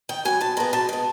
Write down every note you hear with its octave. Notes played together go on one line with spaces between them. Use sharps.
D#3 G5
F#3 B3 G#5
B2 A5
G#3 B3 A#5
B2 A5
G#3 B3